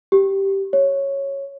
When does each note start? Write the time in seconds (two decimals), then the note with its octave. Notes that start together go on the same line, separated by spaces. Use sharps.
0.12 G4
0.73 C#5